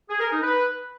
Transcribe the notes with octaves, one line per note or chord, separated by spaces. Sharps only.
G#4
A#4
D#4
B4